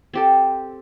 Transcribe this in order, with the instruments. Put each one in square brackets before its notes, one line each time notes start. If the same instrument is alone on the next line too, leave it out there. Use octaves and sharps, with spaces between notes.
[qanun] C4 G4 A4